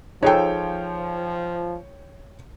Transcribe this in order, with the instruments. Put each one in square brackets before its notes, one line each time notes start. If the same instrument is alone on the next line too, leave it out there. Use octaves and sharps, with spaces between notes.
[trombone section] F3 [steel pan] D#4 G#4 A4 [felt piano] C#5 G5